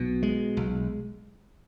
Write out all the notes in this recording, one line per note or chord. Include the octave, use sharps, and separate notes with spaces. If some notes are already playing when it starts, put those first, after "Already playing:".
Already playing: B1 B2
G#3
B1